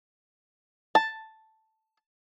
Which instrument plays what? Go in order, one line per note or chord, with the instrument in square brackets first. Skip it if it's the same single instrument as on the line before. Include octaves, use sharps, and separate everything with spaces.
[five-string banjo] A5